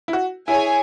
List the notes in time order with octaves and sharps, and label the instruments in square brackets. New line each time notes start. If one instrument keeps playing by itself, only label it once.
[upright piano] E4
F#4
[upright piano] E4 [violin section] G#4 C#5 G#5